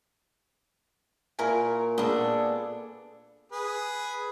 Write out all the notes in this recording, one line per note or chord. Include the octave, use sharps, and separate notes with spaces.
A#2 E4 A#4 G#5 C#6
A#2 B3 D4 G#4 A4 D#6
G#4 B4